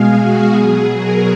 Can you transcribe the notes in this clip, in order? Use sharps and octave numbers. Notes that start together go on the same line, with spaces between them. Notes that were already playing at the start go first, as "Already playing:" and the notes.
Already playing: B2 G#3 G#4 F5
F#4
B2 G#4
F#3
A#4